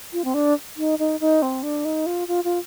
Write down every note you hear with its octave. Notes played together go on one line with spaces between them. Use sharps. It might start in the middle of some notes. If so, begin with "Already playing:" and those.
F4
C4
D4
D#4
D#4
D#4
C4
D4
D#4
F4
F4
F4